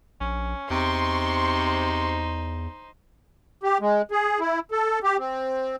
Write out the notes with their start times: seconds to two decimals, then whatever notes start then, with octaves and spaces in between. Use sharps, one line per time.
0.21 A#1 C#4
0.70 E2 C3 D#4 C5 C6 C#6
3.63 G4
3.81 G#3
4.11 G#4
4.40 E4
4.71 A4
5.03 G4
5.19 C4